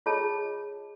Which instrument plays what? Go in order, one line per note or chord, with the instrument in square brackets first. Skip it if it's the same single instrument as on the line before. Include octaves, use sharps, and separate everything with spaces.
[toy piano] F4 G#4 C#5 D#5 A5